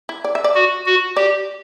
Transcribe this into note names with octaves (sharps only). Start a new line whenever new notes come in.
E4
D5
E5
D5
F#4
F#4
G4 D5